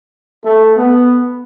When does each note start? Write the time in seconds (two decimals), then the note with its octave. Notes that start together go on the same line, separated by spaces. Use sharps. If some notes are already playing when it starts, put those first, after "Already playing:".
0.45 A3
0.77 B3